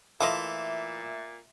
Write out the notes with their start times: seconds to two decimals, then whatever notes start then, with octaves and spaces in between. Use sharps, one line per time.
0.20 A#2 E3 A3 F4 D#5 E5 C6 D6